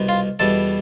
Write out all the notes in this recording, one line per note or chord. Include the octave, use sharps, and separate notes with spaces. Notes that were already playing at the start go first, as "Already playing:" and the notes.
Already playing: C2 B2 B3
F4 F5
E2 B2 G3 B3 A4 A5